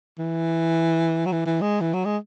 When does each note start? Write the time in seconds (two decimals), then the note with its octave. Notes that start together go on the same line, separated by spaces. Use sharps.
0.18 E3
1.26 F#3
1.32 E3
1.46 E3
1.61 G#3
1.81 E3
1.94 F#3
2.05 G#3